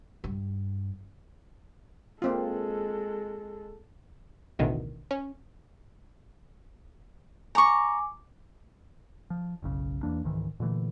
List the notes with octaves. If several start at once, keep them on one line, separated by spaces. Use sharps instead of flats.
G2
G#3 A#3 C4 F4 A4
A1 D2 B2 D#3
C#4
G#5 A#5 C#6 D6
F3
F#1 B1 C#3
E2 E3 A#3 D4
C#2 G#2 D#3 E3
A#2 D3 E3 A3